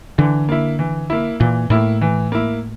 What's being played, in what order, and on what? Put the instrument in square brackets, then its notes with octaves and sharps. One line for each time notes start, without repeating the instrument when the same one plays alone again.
[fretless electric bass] D3 [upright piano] E3
[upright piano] A#3 E4
E3
A#3 E4
[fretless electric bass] A#2 [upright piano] E3
[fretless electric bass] A2 [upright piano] A#3 E4
[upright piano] E3
A#3 E4